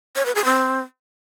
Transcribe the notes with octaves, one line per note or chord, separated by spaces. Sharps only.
C#5
B4
G#4
C4